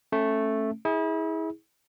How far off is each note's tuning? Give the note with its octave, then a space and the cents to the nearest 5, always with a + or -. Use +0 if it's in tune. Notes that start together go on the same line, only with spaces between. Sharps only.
A3 +0 C#4 -25
E4 -35 G#4 +0